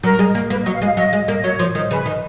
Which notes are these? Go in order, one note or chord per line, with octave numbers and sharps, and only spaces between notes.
F#3 A#4
G#3
A#3
A#3 B4
D#5
F#3
F5
G#3
F5
F#3 D#5
G#3
A#3
D#5
F#3 C#5
F3
D#3
C#3 B4
D#3